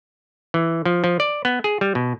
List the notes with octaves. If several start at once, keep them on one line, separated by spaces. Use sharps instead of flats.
E3
F3
F3
D5
B3
G#4
G3
B2